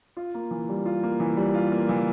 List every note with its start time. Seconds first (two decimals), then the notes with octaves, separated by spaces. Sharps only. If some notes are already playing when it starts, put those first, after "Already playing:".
0.17 F4
0.34 A#3
0.51 E3
0.69 G3
0.86 F4
1.03 A#3
1.20 E3
1.37 G3
1.54 F4
1.72 A#3
1.89 E3